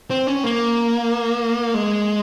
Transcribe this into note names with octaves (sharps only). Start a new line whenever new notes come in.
C4
C#4
A#3
G#3